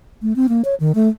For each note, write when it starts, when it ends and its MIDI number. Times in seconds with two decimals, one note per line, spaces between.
0.22 0.35 57
0.36 0.47 60
0.49 0.62 58
0.65 0.75 73
0.80 0.92 51
0.95 1.09 57